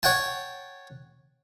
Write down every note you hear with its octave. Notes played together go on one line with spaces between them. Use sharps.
C#5 F#5 G5 A5